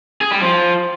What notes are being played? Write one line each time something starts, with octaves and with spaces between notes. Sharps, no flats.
G#4
G3
F3